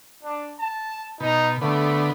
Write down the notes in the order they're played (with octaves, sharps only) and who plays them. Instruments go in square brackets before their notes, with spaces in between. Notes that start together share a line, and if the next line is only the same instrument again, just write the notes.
[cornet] D4
A5
[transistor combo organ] B2 [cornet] D#4
[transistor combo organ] D3 B3 [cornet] A3